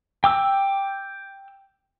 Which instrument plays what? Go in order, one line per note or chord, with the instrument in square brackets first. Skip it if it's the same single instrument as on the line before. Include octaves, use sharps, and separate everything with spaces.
[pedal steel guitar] G5 D6 E6